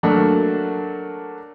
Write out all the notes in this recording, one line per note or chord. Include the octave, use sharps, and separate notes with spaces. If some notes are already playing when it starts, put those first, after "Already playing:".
F#3 A3 A#3 D4 F#4